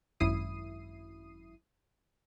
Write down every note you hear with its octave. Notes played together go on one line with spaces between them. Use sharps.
G#1 F#2 E4 D#6 C7 D#7